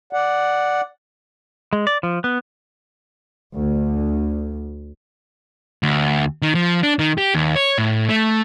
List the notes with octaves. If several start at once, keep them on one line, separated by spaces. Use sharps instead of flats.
D5 F#5
G#3
D5
F3
B3
D2
D2
D#3
F3
D4
D#3
G4
D#2
C#5
A2
A3